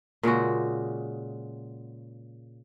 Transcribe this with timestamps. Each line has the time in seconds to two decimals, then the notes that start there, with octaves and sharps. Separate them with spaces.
0.23 A#2 C#3 G#3 F#4